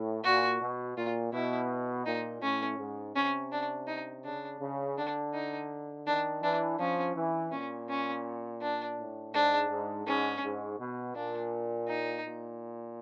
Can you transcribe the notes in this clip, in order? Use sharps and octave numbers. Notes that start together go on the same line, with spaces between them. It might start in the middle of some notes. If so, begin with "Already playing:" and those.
Already playing: A2
A#2 F#4
B2
A#2 F4
B2 E4
A#2 D#4
A2 C#4
G#2
C3 C#4
D4
D#4
C#3 D4
C#3
D3 D4
D#4
D#3 D4
E3 D4
F3 C#4
E3
A#2 C#4
C#4
D4
A2
G#2 D4
G#2
G#2 C#4
G#2
B2
A#2 D4
D#4
A#2